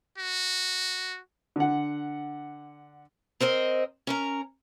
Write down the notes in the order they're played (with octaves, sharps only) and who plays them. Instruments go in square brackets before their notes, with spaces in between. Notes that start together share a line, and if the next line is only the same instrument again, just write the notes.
[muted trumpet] F#4
[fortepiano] D3 F#5
[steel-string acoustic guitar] C4 A#4 C5 D#5
C#4 A#4 A#5